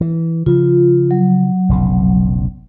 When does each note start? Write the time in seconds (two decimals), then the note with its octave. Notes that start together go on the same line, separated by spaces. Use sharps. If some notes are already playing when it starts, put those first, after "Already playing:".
0.01 E3
0.46 C#3 F3 F4
1.11 F#3
1.69 F1 B1 C#3